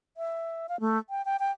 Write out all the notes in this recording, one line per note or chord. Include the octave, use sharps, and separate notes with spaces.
E5
F5
A3
G5
G5
G5